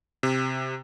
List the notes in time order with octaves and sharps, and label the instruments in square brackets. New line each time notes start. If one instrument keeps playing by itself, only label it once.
[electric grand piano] C3